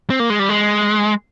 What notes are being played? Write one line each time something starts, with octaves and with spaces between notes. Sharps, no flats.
C4
A#3
G#3
G3
G#3